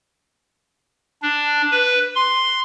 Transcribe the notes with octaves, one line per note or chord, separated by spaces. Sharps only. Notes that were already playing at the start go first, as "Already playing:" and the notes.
D4
B4
C6